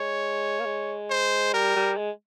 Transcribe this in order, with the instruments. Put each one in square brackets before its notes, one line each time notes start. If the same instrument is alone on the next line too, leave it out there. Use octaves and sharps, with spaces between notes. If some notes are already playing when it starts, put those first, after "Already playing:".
Already playing: [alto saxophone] G#3 [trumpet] C#5
[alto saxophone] A#3
G#3
[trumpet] C5
[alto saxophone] G3 [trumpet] A#4
[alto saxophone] G3
G#3